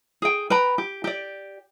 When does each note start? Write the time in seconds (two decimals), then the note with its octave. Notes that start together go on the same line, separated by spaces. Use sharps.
0.22 G#4 G5
0.50 B4 G5 A#5 B5
0.78 G4
1.04 G4 D5